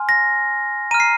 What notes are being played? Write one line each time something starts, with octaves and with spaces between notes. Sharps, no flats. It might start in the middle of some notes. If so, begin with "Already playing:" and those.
Already playing: G#5 C6 F6
A#6
A#5 F6 D#7
C7